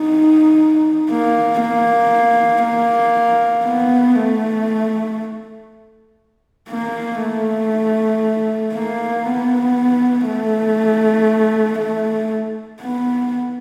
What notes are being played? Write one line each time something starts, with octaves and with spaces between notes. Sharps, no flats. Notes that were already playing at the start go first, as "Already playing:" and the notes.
Already playing: D#4
A#3
A#3
A#3
B3
A3
A#3
A3
A#3
B3
A3
A3
B3